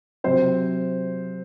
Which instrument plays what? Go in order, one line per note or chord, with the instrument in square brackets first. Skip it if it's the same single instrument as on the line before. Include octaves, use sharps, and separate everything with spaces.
[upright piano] C3 F#3 C4 C5